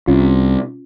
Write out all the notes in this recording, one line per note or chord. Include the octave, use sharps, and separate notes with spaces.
C2 C#4 F4